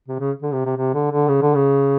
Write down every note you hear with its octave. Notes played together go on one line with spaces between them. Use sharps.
C3
C#3
D3
C3
C3
C3
D3
D3
C#3
D3
C#3